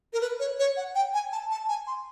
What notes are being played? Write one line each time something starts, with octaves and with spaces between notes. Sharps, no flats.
A#4
B4
C#5
C#5
F#5
G5
G#5
A5
A5
G#5
C6